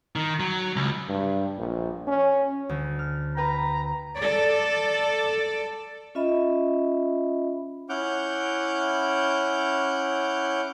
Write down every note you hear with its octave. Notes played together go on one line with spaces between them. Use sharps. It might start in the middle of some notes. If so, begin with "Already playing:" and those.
D#3
F#3
C#2
G2
A#1
C#4
D2
F6
B4 G5 A#5
A4 D5
C#4 F4 D#5 E5 B5
C#4 E4 F#5 D6 F6 G6